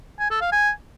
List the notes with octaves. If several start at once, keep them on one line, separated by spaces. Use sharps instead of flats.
G#5
A4
F5
G#5